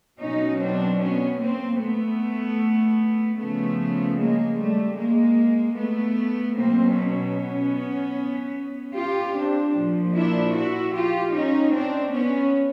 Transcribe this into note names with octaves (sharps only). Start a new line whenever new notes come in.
B2 F#3 C#4 D#4
C4 D4
B3 C#4
A#3 C4
A3 B3
C#3 F3 A3 B3
G#3 A#3
G3 A3
G#3 A#3
A3 B3
B2 F#3 A#3 C4
B3 C#4
F4 G4
C4 D4
A#2 F3
D4 E4
E4 F#4
F4 G4
C#4 D#4
C4 D4
B3 C#4